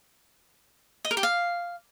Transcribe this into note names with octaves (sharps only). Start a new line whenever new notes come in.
D#5
A#4
G4
F5